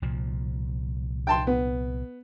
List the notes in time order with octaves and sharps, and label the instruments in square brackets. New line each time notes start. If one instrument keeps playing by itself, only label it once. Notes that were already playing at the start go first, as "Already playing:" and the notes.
[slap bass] C2 A#2 F3
[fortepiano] G5 A5 C6
B3